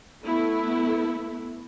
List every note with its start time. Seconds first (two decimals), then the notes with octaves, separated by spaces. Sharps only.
0.23 A3 B3 E4